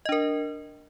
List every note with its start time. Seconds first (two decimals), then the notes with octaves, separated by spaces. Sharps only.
0.05 D#5
0.09 D4
0.12 A#4